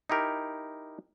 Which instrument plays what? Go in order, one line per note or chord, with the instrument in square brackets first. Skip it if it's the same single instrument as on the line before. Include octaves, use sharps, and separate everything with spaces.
[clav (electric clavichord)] D#4 E4 G4 A#4